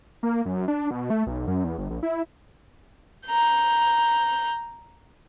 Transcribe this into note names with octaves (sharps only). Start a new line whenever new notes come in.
A#3
F#2
D4
B2
A3
B1
F#2
E2
G1
A#1
E4
A#5 G6